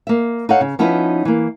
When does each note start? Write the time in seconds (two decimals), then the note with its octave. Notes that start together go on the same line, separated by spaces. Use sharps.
0.07 A#3 E5
0.49 D#4 A4 C#5 F5 F#5
0.61 C#3
0.79 F3 B3 C#4 D#4 E4 B4
1.25 E3 A#3